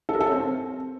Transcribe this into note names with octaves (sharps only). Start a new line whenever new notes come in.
A4
A#4
A4
C#4
C4